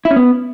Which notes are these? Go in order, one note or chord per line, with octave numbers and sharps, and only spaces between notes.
E4
C#4
B3